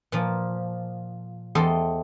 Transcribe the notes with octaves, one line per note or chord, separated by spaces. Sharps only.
A#2 F3
E2 A4 C5 D#5 G5